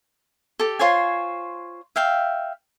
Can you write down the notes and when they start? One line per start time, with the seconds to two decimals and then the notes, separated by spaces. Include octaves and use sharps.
0.59 G4 A4
0.79 F4 C5 C#5 G#5
1.96 E5 F5 G5